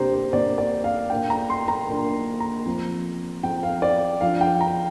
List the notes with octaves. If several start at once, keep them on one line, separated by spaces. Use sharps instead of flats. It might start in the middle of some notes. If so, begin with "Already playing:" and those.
Already playing: C3 A#3 D4 G4 C5 A#5
C5
C3 A#3 D4 D5
D5
F5
A#2 A#3 D4 G5
A#5
C6
A#5
A#2 A#3 D4
A#5
F3 C4
F3 C4 G5
F5
D5
F3 D4 F5
G5
A#5